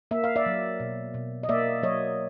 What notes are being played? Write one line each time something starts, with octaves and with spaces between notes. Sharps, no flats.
A#3 E5
F5
D5 E5
F#3
B2
B2
D#5
A#3 D5 E5
F#3 C#5 D#5